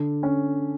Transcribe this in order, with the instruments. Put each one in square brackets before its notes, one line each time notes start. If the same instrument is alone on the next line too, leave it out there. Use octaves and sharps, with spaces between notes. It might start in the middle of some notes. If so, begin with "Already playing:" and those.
Already playing: [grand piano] D3
C#4